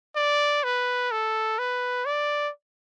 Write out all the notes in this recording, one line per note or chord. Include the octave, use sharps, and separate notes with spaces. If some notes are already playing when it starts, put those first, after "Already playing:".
D5
B4
A4
B4
D5